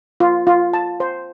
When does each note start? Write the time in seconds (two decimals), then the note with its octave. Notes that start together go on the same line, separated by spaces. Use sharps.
0.20 F4
0.47 F4
0.73 A5
1.00 C5